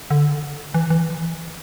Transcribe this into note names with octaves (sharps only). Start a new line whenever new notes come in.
D3
E3
E3